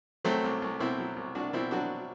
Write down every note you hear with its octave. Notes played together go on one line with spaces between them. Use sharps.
F#3 A3 C4
C2
C2
B2 C4 E4
F#3
C2
C2 D4 F#4
B2 C4 E4
F#3 D4 F#4